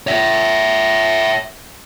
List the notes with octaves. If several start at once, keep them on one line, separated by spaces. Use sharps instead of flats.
C#5 E5